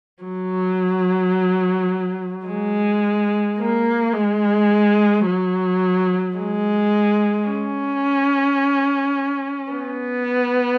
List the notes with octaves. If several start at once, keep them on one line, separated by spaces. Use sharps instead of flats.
F#3
G#3
A#3
G#3
F#3
G#3
C#4
B3